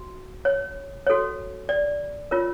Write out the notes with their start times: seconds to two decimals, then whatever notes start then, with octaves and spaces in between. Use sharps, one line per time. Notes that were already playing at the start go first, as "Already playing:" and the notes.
Already playing: F#4
0.45 C#5
1.07 F#4 A4 C#5
1.69 D5
2.31 F4 A#4 C#5